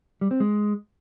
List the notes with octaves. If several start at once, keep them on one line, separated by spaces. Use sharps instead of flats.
G3
C4
G#3